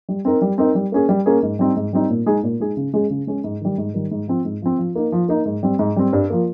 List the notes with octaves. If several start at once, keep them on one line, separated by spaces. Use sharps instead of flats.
G3
C4 D#4 A#4
G3
C4 D#4 A#4
G3
A#3 C#4 G#4
G3
A#3 C#4 G#4
G#2
G3 C4 D#4
G#2
G3 C4 D#4
A#2
G#3 D#4 G#4
A#2
G#3 D#4 G#4
C#3
G#3 C#4 G#4
C#3
G#3 C#4 G#4
G#2
D#3 G3
G#2
D#3 G3
G#2
F3 C4
G#2
F3 C4
F3
A#3 D#4
F3
A#3 D#4
G#2
G3 C4
G#2
G3 C4
G2
F3 A#3